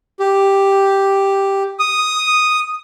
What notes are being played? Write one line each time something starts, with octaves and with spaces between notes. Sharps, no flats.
G4
D#6